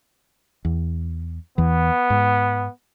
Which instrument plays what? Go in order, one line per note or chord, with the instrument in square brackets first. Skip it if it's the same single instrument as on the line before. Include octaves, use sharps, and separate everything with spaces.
[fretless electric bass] E2
[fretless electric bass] E2 E3 [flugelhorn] B3
[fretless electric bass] G#2